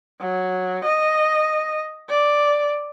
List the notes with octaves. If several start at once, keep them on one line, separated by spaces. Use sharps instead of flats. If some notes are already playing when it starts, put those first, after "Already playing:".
F#3
D#5
D5